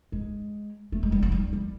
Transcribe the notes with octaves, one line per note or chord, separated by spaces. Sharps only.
G#3
A3
G#3
G3
F#3
G3
G3